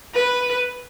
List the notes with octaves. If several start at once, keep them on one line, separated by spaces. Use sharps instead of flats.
B4